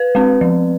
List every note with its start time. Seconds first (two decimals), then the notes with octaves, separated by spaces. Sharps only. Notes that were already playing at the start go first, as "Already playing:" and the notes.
Already playing: B4
0.15 G#3 C4
0.41 F3